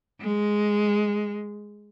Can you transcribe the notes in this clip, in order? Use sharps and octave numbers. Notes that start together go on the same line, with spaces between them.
G#3